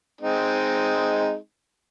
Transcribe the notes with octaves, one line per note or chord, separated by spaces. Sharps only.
G#3 C4 D#4